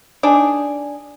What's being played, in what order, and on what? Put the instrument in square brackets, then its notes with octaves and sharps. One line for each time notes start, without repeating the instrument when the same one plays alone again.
[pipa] D4 D#4 G#4